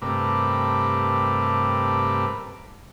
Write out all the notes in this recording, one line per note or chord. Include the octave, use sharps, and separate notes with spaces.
G2 C3 A3 A#4 B4 D6